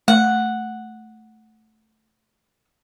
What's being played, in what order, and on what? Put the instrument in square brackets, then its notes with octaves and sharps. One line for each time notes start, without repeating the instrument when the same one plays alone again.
[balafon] A3 [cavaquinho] F#5